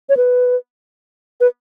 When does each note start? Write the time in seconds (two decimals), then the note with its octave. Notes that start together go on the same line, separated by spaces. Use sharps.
0.09 C#5
0.17 B4
1.41 B4